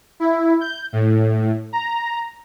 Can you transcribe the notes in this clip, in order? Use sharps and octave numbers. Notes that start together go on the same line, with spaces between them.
E4
G6
A2
A#5